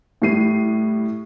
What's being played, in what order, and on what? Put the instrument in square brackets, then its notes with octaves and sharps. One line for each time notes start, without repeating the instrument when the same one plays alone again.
[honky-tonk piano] A2 G3 C7 D#7